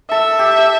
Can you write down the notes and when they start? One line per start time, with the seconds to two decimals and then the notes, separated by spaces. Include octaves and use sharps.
0.11 A4 E5
0.39 G4